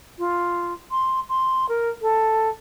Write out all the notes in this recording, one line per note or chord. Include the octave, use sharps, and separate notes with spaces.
F4
C6
C6
A#4
A4